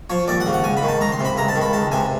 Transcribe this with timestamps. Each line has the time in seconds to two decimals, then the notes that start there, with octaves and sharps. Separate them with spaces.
0.10 F3 C#5
0.28 D#2 D5
0.40 F#5
0.46 C#3
0.53 F#5
0.64 C#2 G#5
0.77 B5
0.83 D#3
0.88 A5
1.01 C#2 A#5
1.12 C6
1.19 C3
1.25 B5
1.37 C#2 A#5
1.48 A5
1.56 D#3
1.61 B5
1.73 C#2 A5
1.92 C3 G#5